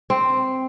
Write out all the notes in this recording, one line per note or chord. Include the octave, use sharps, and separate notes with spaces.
C4